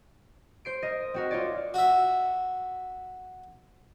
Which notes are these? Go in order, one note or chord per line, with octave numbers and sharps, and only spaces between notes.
C5 C7 D7
A#4 D#5
C4 F#4 A#4
F4 C#5 D5
F#4 E5